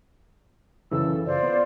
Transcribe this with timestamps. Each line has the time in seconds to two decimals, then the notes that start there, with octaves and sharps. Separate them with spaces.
0.91 F#2 C#3 E3 A4 E6
1.25 F4 C5 D5
1.43 B3